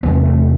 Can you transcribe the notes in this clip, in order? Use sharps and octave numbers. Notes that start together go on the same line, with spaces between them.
E2 C3 B3
A3